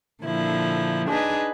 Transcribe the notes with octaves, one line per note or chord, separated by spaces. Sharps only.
A#2 D3 F3 E4
D4 D#4 G#4 B4